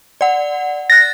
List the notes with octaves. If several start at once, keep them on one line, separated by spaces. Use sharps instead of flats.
D5 F#5
F#6 A6 A#6